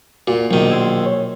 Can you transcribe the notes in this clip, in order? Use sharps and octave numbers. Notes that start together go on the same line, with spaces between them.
A#2 F#4
A#1 B2 D#3 F#3
C6 E6 G#6
C#5